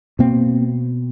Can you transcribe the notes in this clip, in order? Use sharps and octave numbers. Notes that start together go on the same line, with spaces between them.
B2 A#3 C4